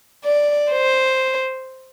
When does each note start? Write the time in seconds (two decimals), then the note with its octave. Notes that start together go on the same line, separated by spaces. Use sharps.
0.24 D5
0.72 C5